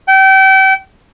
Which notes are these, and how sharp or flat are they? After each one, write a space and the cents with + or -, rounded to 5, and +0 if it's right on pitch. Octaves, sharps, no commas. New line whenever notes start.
G5 -35